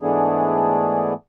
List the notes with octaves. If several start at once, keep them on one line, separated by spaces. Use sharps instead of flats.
G#2 E3 A3 B3 D4 G#4